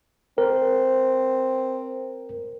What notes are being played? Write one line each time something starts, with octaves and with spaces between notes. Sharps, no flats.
C4 A#4